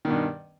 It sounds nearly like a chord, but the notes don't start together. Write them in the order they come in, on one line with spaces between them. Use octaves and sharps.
D#3 B2 G2